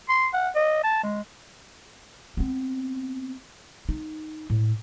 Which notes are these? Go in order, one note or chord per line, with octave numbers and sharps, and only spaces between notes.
C6
F#5
D#5
A5
G#3
B3 C4
D#4
A2